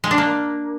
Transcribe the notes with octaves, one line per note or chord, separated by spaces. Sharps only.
G#3
D4
A#3